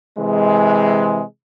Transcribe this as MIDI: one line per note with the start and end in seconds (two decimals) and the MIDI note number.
0.18 1.23 48
0.18 1.23 52
0.18 1.23 56